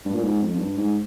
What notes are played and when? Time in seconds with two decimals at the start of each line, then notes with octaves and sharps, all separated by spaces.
0.05 G2
0.14 A#2
0.23 G#2
0.42 F2
0.55 F2
0.59 G2
0.77 G#2